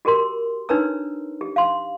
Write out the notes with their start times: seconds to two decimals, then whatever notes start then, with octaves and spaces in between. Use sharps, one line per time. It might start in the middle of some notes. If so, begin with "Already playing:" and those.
0.05 F#4 G4 A#4 C6
0.69 D4 D#4 B4 C#5 A#5 E6
1.41 G4
1.56 F5 C6